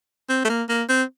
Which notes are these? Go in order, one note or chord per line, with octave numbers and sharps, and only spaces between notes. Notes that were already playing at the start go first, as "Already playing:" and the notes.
C4
A3
A#3
A#3
C4